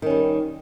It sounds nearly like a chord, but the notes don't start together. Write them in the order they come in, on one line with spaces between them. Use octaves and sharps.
D#3 C#4 G3